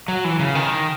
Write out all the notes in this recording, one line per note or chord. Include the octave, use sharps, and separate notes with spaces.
F#3
E3
C#3
D#3